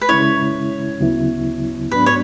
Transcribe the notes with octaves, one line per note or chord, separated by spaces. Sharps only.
B4
C#3 G#3 C#4 E4 C#5
D2 C#3 F#3 B3 E4
G#2 F#3 B3 D4 B4
C#5